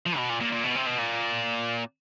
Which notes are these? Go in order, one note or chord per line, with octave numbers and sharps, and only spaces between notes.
F3
B2
A#2
A#2
A#2
B2
C3
B2
A#2